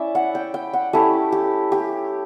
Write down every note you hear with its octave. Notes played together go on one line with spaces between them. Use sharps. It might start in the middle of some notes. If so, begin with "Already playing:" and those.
Already playing: C#4 E4 D5 E5
F#5
G5
G5
F#5
A3 C#4 E4 G4
G4
G4